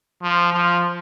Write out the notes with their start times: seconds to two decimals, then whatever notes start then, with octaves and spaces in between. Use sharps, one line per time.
0.22 F3
0.53 F3